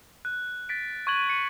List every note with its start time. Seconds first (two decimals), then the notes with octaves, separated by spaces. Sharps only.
0.25 F#6
0.69 A6 B6 D7
1.07 C#6 F#6 G#6 D#7 F#7
1.29 C#7 D#7